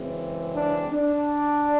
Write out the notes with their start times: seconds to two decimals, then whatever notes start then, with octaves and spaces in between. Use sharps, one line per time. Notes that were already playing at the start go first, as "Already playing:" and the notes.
Already playing: F#2 C#3 E3 G#3 C4
0.55 D4
0.92 D4